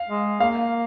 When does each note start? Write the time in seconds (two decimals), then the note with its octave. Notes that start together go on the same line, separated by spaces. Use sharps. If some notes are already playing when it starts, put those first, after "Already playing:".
Already playing: F5
0.09 G#3
0.40 A#3 F5